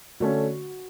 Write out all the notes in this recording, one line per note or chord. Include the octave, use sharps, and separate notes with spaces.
D3 A3 C#4 F#4